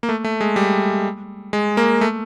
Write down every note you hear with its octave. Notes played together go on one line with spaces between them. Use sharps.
A#3
A3
A3
G#3
G3
G#3
A#3
A3